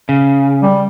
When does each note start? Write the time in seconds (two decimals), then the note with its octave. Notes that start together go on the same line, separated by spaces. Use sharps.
0.09 C#3
0.62 G3